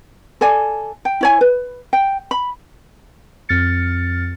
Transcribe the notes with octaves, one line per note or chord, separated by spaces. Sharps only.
A4 D5 G#5
G5
E4 C#5 G#5
B4
G5
B5
F2 F6 A6 C#7